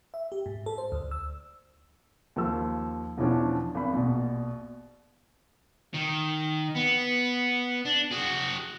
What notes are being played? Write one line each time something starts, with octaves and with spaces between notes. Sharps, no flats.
E5
G4
G#2
A4
C5
D2
E6
D#2 F3 E6
E2 B2 E3 F3 C#4 D4
G#1 B5
A#1 B2
D#3
B3
D4
F#4 G#4